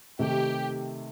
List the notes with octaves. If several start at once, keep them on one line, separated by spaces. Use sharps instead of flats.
C3 D#3 A3 D#4 G4